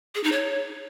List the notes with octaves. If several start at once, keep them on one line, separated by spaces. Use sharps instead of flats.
G#4
D#4
C#5